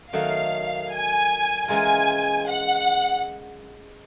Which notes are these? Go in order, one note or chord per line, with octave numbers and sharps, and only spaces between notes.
D#3 F#3 A3 F5
G#5
E3 G#3 C#4 F4 A#4 G#5
F#5